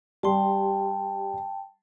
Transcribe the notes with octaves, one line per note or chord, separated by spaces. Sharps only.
G3 G4 G5 A5 C6